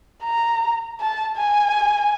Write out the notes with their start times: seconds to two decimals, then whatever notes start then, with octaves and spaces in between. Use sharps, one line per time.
0.24 A#5
1.01 A5
1.37 G#5